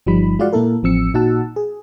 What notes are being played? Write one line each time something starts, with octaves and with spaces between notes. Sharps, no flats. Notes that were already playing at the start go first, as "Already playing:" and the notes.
G1 F3 G3 D#4 B5
G#3 F4 F#4 D5 F5 F#5
A#2 A#3 E4 A4 A#4
A1 F3 C4 E6 C#7
A#2 D#4 F#4 F#5 A5 E6
G#4